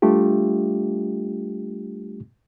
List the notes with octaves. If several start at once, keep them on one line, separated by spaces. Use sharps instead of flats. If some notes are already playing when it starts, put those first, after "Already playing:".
G3 A3 D4 F4 G4